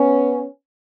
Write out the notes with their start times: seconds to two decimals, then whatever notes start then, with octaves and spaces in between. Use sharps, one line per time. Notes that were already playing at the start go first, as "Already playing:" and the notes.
Already playing: B3 C#4